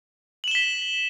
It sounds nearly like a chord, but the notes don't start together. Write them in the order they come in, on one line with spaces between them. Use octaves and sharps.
F#7 E7 G7 B6